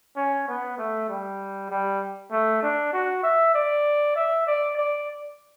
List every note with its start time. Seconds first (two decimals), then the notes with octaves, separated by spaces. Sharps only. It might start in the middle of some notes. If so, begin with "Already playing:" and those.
0.16 C#4
0.48 B3
0.78 A3
1.09 G3
1.70 G3
2.31 A3
2.62 D4
2.93 F#4
3.23 E5
3.54 D5
4.16 E5
4.47 D5
4.77 D5